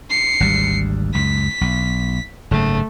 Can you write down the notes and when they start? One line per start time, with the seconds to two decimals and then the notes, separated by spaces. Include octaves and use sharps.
0.10 C7 C#7
0.40 G#1 D2 G3
1.14 C#2 F#2 B6
1.61 B1
2.51 F#1 G#2 C#3 A3